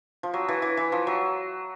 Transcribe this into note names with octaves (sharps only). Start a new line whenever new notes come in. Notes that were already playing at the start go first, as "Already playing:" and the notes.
F3
F#3
E3
E3
E3
F3
F#3